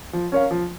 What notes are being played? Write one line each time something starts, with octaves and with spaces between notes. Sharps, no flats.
F3
C#4 A#4 C#5 F5
F3